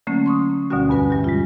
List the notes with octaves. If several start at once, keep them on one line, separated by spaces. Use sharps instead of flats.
D3 F#3 A3 A#3 C#4
C6 C#6 D#6
D2 B2 D3 G3 C#4 F#4
E2 G2 F#4 B4 G#5
E3 G3 G4
G#3 F4